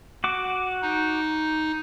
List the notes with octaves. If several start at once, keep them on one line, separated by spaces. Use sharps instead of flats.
F#4 D6
D#4